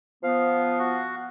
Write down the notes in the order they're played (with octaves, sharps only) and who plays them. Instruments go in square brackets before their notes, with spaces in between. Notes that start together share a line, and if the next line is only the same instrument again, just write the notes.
[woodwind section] F3 B3 [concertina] F5
[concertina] F#4